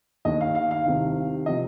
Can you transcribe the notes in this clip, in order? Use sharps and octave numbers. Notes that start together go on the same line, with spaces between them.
D#2 D#3 D#5
F5
F5
F5
C2 C3 D#3
C3 F3 D#5